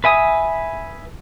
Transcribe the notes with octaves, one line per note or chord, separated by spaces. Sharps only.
B4 E5 G#5 D#6